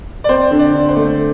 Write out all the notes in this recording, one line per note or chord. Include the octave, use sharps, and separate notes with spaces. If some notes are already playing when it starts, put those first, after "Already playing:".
D5
C4 C5
D3
D5
D3
C5
A3